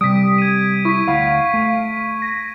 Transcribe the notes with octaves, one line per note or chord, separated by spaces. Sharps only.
C3 G3 D#6 B6 D7
G#6 D#7
E4 C#6 B6
D2 F5 F#5 B5
A3
A#6